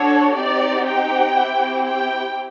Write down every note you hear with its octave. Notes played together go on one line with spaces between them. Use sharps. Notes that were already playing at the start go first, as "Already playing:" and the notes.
Already playing: D4 F#4 A4 C#5
C4 D#4 G4 D5
G5
C4 E4 G4
G5